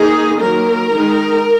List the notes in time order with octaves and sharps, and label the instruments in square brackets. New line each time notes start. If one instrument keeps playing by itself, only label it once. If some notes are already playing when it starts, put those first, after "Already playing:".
Already playing: [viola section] D#3 A#3 D#4 G#4
D#3 F#3 A#3 A#4
D#3 G#3 D#4